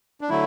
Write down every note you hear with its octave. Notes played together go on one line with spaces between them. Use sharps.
D4
D3 F#3 A3 E4